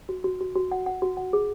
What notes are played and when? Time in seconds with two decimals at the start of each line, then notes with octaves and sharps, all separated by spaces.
0.09 F#4
0.24 F#4
0.41 F#4
0.55 F#4
0.71 F#5
0.86 F#5
1.02 F#4
1.17 F#5
1.33 G#4